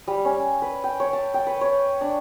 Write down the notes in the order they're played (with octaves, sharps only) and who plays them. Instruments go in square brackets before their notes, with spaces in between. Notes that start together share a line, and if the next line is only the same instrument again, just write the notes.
[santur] G3
C#4
B4
G5
C#5
A5
G5
B4
C#5
D4